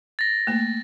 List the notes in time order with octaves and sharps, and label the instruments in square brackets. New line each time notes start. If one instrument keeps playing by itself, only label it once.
[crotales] A6 A#6
[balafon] A3 A#3